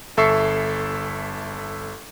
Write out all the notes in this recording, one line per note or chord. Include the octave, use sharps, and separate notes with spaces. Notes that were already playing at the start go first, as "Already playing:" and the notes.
G1 A4 E5 C#6 C7 C#7